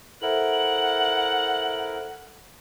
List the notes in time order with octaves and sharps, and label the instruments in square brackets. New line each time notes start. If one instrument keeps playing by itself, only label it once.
[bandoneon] E4 A#4 [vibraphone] A4 C5 E5 [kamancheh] F#5 [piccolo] F#7